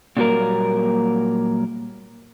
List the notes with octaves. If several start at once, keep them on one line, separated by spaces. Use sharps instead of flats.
A#2 D3 F#3 G3 A#3 A#4